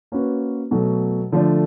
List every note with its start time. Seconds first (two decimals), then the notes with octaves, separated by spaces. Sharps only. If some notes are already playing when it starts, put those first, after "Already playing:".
0.12 A#3 C#4 F#4 B4
0.71 B2 F#3 A3
1.32 D3 F3 A3 D4